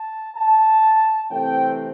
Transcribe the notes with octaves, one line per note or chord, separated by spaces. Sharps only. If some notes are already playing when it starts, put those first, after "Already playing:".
Already playing: A5
A5
C3 E3 A3 C4 G5